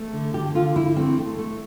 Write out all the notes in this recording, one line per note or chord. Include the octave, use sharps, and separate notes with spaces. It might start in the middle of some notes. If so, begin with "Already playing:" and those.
Already playing: A3
D3
D3 G4
D3 F4
D3 E4
A3 C4
A3
A3